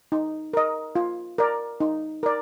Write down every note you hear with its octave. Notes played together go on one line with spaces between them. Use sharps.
D#4
A#4 D#5
F4
A#4 D5
D#4
A#4 D5